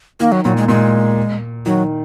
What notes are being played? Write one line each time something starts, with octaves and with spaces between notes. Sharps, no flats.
D#3 A#3
F#3
A#2 F#3
G#3
A#2 G#3
D#3 F#3